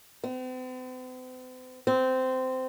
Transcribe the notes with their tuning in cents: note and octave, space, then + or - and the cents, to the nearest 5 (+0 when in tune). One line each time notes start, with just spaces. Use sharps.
C4 -45
C4 -15